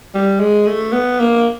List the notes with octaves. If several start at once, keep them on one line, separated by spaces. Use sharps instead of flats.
G3
G#3
A3
B3
A#3